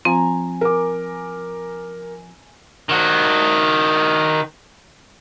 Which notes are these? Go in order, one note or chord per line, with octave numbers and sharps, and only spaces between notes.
F3 C4 G#5 A#5
A#4 D6
D#3 F#4